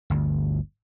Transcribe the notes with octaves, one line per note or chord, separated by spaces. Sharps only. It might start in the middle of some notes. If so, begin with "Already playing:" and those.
G1 D2